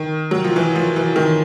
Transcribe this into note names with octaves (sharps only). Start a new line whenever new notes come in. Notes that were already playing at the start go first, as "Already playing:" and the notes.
Already playing: D#3
F#3
F3
E3
F3
E3
D#3